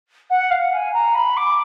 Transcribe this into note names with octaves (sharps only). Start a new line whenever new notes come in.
F#5
F5
G#5
A#5
B5
D6